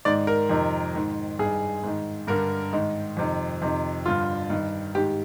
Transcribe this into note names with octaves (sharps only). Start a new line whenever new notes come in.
G#2 D#3 D5
A#4
F2 C3 D#3
G#2 D#3
G2 D#3 G#4
G#2 D#3
G2 D3 A#4
G#2 D#3
F2 C3 D#3
F2 C3 D#3
G2 D3 F4
G2 D#3
G#2 D#3 G4